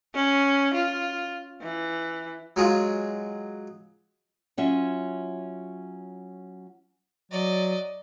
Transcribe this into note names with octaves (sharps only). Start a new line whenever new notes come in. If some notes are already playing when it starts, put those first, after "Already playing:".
C#4
F4
E3
F#3 G#3 F4
F#3 C#4 F4 E5
F#3 D5 D#5